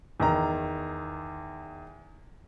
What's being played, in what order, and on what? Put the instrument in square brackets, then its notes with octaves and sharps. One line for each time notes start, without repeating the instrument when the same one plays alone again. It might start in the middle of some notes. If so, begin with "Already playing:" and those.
[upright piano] E2 D#3 A#5